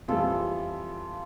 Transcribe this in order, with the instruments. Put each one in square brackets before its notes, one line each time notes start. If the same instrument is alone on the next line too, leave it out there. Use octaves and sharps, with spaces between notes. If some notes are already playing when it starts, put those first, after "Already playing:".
[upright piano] F2 E3 G3 [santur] F4 A4